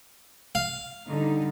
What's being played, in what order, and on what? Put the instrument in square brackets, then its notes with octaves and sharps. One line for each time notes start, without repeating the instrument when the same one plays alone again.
[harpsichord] F5
[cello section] D3 G3 D#4